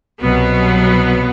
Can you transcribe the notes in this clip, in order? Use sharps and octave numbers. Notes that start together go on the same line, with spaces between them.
C2 B2 F#3 B3